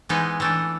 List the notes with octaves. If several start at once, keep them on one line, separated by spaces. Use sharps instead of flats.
E3 G#3 B3 D#4
E3 A3 D4